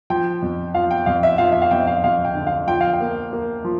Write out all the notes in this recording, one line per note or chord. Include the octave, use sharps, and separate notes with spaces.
F3 G5
F2
F3 F5
G5
F2 F5
E5
F3 F5
E5
F5
F2 G5
F5
F2 F5
G5
D3
F5
F3 G5
F5
G5
A#3
A#3
F3